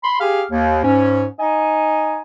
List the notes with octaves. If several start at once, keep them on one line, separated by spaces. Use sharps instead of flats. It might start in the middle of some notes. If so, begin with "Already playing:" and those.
B5 C6
G4 G#4 F5
D#2
G#2 C#4
D#4 D#5 G#5